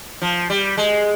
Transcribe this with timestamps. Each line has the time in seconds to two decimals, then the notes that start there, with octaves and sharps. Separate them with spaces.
0.22 F3
0.50 G3
0.77 G#3